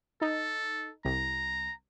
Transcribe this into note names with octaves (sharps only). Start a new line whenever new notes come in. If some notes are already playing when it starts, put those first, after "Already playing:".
D#4 A4
C2 A#5